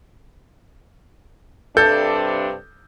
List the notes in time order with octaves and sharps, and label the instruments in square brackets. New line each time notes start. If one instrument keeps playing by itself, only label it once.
[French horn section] G2 C3 D4 [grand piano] A4 G6